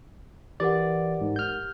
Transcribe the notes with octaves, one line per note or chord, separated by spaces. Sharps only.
E3 G4 A#4 D5 F#5
G#2
F6 G6